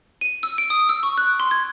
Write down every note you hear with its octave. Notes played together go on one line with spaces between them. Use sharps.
D#7
E6
D7
D#6
E6
C#6
F#6
C6
G#6